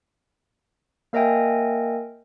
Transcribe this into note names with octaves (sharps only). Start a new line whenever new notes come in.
A#3 A#4 D#5 E5 G5 G#5